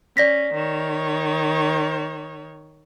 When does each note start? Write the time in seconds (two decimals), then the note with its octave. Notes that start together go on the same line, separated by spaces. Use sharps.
0.17 C#4 D5 A#6 B6
0.54 D#3 C#5